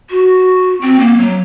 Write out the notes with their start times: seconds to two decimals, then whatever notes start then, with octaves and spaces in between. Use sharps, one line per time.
0.10 F#4
0.81 C4
0.99 A#3
1.17 F#3